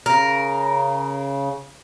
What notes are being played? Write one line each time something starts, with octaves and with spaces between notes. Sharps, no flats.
C#3 A#4